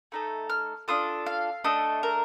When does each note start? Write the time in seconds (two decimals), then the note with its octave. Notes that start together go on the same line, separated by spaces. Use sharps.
0.12 A3 D#4 A4
0.49 F6
0.88 D4 F4 A4 D#6
1.26 F5
1.64 A3 D4 A4 D#5
2.03 A#4